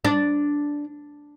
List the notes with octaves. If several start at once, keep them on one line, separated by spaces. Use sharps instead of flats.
D4